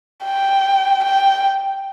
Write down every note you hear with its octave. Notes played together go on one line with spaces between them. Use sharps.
G5
G5